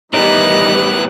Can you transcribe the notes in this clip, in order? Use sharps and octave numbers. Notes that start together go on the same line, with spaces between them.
A2 D#3 E3 G3 B3 D#4 F#6